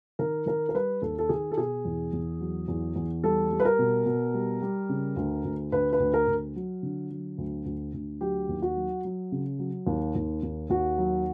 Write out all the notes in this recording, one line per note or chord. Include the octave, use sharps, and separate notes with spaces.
D#3 A#4
D#3 A#4
A#4
G3 B4
D#2 A4
A4
D#3 G#4
A4
B2 G#4
E2
E2
F#3
E2
E2
G3 A4
G3
B4
A#4
B2
B2
G3
G3
C#3
D2
D2
D2 B4
B4
D2
A#4
D2
F#3
D3
F#3
D2
D2
D2
F#3 G4
D#2
F#4
F#3
F#3
C#3
F#3
D#2
D#2
D#2
D#2 F#4
F#3